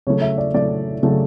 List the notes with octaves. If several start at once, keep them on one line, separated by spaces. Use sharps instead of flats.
C#3 F#3 A3 C#5
E5
D5
C#3 F#3 A3 D5
C#3 F#3 A3